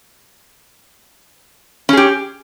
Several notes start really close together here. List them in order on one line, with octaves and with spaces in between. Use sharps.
C#4 G#4 G4